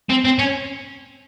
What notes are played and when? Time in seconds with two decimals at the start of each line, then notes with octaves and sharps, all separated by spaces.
0.09 C4
0.24 C4
0.39 C#4